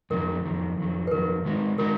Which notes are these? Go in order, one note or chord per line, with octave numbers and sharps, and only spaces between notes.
F2 D#3 F#3 A#4
F2 D#3 F#3
F2 D#3 F#3
B4
F2 D#3 F#3 A#4
D#3 G#3 D#4 F#4
D#3 G#3 D#4 F#4 A#4